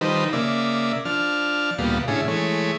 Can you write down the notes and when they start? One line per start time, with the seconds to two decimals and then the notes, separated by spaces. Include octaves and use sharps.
0.01 D#3 F3 G3 D#4 B4 C5
0.33 C#3 A#3 D5 E5
1.05 F3 D4 F6
1.78 D2 A#2 G3 B3 F4
2.08 A2 D3 C#4 E4 G#4
2.28 E3 G#3 A3 C#5